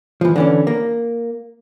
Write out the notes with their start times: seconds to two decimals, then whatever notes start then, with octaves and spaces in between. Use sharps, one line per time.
0.21 E3 F3
0.36 D3 E3 C#4
0.67 A#3